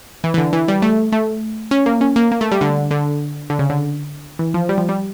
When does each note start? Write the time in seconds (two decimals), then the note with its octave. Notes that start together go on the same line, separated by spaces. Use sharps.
0.24 E3
0.34 E3
0.38 D3
0.53 E3
0.68 G3
0.82 A3
1.12 A3
1.71 C#4
1.86 A#3
2.01 C#4
2.16 A#3
2.31 A#3
2.41 A3
2.52 G3
2.61 D3
2.91 D3
3.50 D3
3.59 C#3
3.70 D3
4.39 E3
4.54 F3
4.69 G3
4.78 F3
4.89 G3